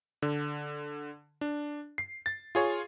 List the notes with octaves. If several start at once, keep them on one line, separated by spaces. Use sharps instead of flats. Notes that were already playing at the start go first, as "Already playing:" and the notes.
D3
D4
C7
A6
F4 G#4 C#5